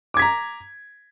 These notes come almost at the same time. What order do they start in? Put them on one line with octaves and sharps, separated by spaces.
D6 G#6 B6 A#5